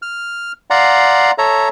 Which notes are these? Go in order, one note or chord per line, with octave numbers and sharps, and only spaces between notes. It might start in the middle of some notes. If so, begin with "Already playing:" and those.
F6
D5 F5 F#5 A#5 C6
A4 C#5 E5 A#5